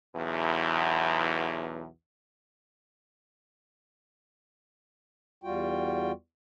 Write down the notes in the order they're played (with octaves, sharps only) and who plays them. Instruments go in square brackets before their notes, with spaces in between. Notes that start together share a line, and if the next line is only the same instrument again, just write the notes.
[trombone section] B1 E2
[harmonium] E2 G3 F4 F#4 G5